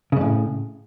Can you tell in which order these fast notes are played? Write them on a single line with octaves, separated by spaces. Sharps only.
C#3 F#2 A2